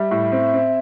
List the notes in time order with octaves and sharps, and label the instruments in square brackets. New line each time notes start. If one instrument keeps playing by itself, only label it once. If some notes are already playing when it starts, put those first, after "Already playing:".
Already playing: [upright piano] G3 [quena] E5
[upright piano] A2
C4
C4